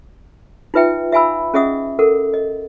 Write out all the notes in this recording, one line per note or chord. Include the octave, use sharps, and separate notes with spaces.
D#4 F4 B4 E5 G5
E5 F5 G#5 B5 E6
C#4 G#4 D#5 E5 F#5 D#6
A4 A#4 F#5
D#5